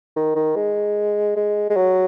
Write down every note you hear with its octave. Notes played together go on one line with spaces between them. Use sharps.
D#3
D#3
G#3
G#3
G#3
F#3